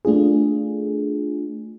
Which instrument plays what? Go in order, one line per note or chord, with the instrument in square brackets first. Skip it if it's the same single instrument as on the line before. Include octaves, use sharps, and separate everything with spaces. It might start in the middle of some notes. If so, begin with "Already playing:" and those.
[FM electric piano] A3 D4 F4 G#4